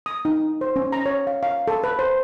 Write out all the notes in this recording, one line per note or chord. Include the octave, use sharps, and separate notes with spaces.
D#6
D#4
C5
C#4
A#5
C#5
F5
F5
A4
B4
C5